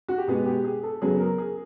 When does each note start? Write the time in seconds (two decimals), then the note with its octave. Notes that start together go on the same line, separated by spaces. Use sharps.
0.08 F#4
0.18 G4
0.27 B2 G#3 B3 G#4
0.46 G4
0.64 G#4
0.83 A4
1.02 C#3 F#3 B3 G#4
1.20 A#4
1.38 G#4